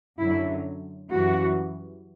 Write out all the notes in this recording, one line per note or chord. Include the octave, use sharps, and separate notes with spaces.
F#2 D3 F#3 E4
F#2 E3 G3 F#4